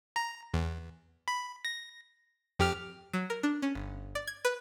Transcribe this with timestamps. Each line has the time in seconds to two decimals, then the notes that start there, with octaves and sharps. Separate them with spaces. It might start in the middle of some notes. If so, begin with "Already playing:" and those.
0.16 A#5
0.54 E2
1.28 B5
1.65 A#6
2.59 F2 G4 F6
3.13 F#3
3.30 A#4
3.43 D4
3.62 C#4
3.75 G1
4.15 D5
4.27 G#6
4.45 B4